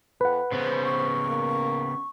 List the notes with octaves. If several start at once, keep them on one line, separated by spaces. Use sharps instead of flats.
F2 B4 F#5
C#3 B3 C5
C#6
A#3